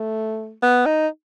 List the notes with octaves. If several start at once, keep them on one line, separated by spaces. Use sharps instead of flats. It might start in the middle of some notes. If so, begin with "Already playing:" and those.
Already playing: A3
B3
D#4